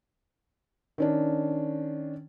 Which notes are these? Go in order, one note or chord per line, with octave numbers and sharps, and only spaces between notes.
D#3 C#4 D4